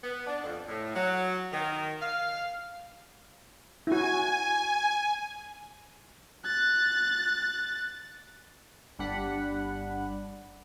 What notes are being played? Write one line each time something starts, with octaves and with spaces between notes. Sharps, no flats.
B3
D4
F2
A2
F#3
D#3
F5
E4 F#4 G#5
F#6 A6
G1 G3 D4 F#5 B5